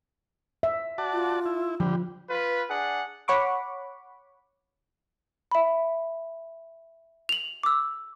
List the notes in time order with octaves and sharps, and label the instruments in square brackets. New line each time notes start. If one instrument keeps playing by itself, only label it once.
[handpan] E5
[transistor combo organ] F#4 D5 A5
[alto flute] F4
[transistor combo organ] E4
[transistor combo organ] D3 G3 [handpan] F3
[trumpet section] F4 B4
D4 G#4 F#5
[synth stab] C#5 F#5 B5 C#6 D6
[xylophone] E5 B5
F7 F#7
D6 E6